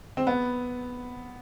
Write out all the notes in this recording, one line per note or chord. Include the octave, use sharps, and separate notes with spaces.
C4
B3